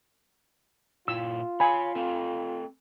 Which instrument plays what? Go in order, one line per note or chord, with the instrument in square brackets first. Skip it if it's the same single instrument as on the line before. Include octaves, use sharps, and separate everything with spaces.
[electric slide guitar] A#2 E4 [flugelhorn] F4 [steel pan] E6
[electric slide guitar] C#5 F5 [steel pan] G#5 B5
[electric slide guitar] A3 C4 A4